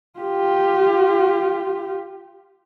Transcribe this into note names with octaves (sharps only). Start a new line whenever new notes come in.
F4 G4